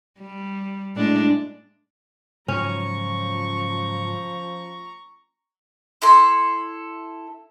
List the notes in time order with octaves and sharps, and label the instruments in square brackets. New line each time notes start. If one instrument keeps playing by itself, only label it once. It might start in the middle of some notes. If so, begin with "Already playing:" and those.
[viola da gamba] G3
A2 G#3 D4
[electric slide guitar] G#2 C#3 F#3 [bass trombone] F3 [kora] C#4 [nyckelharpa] A#5 C#6
[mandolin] E4 A4 C6